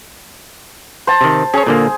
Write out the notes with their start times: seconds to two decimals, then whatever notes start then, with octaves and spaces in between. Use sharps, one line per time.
1.07 C5 A5
1.21 C3 D#3
1.54 C#4 G#4 C#5
1.67 A#2 D3 A#3